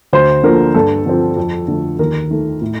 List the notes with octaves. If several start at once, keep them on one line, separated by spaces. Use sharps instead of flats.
D2 C5
D3 F3 A#3 A#4
G2 A4
D3 F3 C4
F2
D3 A3
D#2 A#4
D#3 A3
A2